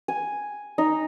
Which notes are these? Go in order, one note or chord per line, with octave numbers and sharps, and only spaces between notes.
G#5
D#4